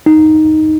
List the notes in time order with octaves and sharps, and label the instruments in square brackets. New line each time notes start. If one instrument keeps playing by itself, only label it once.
[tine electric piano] D#4